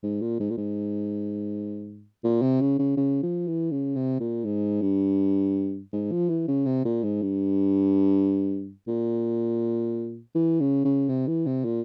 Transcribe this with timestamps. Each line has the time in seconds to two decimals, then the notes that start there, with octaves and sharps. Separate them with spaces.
0.03 G#2
0.22 A#2
0.40 G#2
0.50 A#2
0.58 G#2
2.24 A#2
2.42 C3
2.61 C#3
2.79 C#3
2.97 C#3
3.23 F3
3.47 E3
3.71 C#3
3.96 C3
4.20 A#2
4.45 G#2
4.81 G2
5.93 G#2
6.12 F3
6.29 E3
6.48 C#3
6.66 C3
6.85 A#2
7.03 G#2
7.22 G2
8.88 A#2
10.35 E3
10.60 C#3
10.85 C#3
11.09 C3
11.27 E3
11.47 C3
11.65 A#2